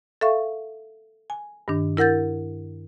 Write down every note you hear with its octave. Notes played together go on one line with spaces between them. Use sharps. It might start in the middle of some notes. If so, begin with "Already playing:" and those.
A4 E5 F5 C#6
G#5
G2 D#3 D4
E4 A#4 F#5 G6 A6